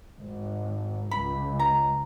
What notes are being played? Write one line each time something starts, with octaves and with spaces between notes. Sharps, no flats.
G#1
C#2 B5
A#5